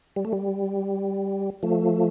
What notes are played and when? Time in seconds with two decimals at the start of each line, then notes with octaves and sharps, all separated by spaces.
0.16 G3
0.25 A3
0.32 G3
1.63 F3 A3